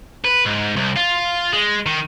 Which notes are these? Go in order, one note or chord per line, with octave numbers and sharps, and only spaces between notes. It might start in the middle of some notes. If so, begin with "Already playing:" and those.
B4
G#2
C2
F4
G#3
D#3